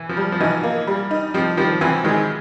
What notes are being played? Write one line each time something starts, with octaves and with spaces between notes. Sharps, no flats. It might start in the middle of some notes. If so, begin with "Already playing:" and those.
Already playing: E3
F3
G3
F3
E3 F#3 D#4
A#3
G3
D#4
F3 G3 C4
D#3 F3 G3
E3 F#3 C4
D#3 F#3 G#3